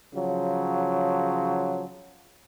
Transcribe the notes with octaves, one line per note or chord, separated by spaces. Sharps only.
C#3 F3 F#3